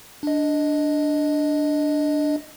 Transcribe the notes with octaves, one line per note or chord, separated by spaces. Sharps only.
D4 D#5